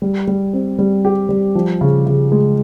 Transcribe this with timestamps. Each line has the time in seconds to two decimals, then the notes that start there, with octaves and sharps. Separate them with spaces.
0.02 G3
0.27 G3
0.53 C4
0.79 G3
1.05 G4
1.29 G3
1.55 F3
1.81 C#3
2.06 C#3
2.32 G#3